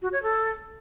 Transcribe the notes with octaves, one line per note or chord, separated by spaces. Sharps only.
F#4
C#5
A4